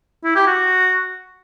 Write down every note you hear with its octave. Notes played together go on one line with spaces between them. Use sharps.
E4
G4
F#4